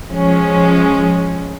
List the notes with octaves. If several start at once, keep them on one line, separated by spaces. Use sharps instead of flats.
F3 G#3 C#4